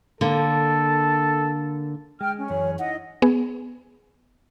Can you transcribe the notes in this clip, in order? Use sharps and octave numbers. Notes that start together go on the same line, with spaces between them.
D3 A#3 A4
G#3 G5 F6
C#4
F#2 E3 G#4 C#5
D#4 E4 D#5 F#5
B3 G#4